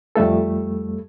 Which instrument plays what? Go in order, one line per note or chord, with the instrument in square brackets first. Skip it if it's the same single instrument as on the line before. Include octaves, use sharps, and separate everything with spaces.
[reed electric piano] F2 G3 A3 A4